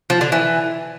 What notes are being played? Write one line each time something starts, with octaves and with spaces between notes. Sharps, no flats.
F3
D3
E3